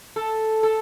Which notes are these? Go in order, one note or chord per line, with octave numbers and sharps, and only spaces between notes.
A4
A4